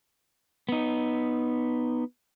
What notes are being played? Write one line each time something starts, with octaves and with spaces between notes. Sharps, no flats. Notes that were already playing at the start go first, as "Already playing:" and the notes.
B3 D#4